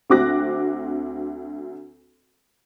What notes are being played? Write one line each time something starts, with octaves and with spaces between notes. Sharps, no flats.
D2 C4 F#4 D6 F#6 A#6